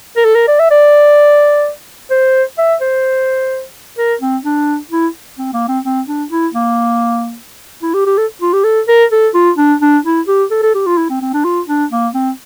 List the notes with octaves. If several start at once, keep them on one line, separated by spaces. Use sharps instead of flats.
A#4
A4
A#4
D5
E5
D5
C5
E5
C5
A#4
C4
D4
E4
C4
A#3
C4
C4
D4
E4
A#3
E4
G4
G4
A4
F4
G4
A4
A#4
A4
F4
D4
D4
E4
G4
A4
A4
G4
F4
E4
C4
C4
D4
F4
D4
A#3
C4